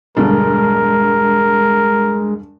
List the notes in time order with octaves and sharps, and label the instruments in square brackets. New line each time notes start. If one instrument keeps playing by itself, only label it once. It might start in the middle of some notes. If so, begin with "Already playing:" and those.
[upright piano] E1 G2 D3 [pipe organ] G#3 [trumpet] A#4